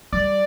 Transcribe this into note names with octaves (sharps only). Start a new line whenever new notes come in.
G3 D5